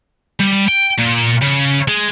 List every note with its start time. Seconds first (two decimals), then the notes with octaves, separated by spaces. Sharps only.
0.40 G3
0.68 G5
0.99 A#2
1.42 C#3
1.88 G#3